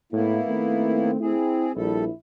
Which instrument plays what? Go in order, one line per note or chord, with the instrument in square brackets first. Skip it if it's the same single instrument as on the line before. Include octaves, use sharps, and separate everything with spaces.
[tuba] A2 [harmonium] A#3 B3 E4
[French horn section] D#3 C4 [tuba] A3
[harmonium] C4 G#4 [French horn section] E4
[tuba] A#1 [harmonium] G3 A4 [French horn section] E4